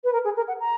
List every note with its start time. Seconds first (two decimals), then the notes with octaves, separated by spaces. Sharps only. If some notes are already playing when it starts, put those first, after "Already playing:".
0.03 B4
0.12 A#4
0.24 G#4
0.36 A#4
0.47 F#5
0.59 A#5